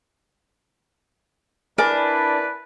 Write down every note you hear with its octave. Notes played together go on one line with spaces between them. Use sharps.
D4 E4 A#4 B4 D5 G#5